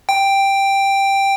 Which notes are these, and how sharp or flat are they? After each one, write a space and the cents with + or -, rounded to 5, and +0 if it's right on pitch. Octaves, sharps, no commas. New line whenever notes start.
G5 +5